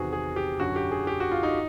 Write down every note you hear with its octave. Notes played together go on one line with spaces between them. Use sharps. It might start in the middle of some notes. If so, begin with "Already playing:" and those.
Already playing: E2 C3 D#3 F#4 G#4
G#4
G4
F#2 D3 F#4
G4
G#4
G4
F#4
F4
D#4